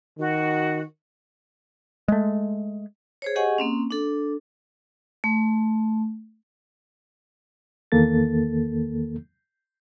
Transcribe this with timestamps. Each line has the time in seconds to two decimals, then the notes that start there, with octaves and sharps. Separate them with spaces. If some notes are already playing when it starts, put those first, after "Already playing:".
0.19 D#3 F#4
2.08 G#3 A3
3.22 G#4 C5 C#5
3.36 G4 G#4 D#5 F#5 G#5 C#6
3.58 A#3 C4 C#4
3.91 D4 A4
5.24 A3
7.92 E2 D#3 A#3 A4 A6